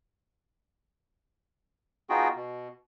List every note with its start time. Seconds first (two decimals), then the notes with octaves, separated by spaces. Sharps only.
2.10 B3 D#4 F4 F#4 G#4 G5
2.35 B2